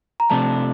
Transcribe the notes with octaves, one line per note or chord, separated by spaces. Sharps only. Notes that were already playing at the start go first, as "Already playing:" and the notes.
A#5
C3 F3 A3 D4 A5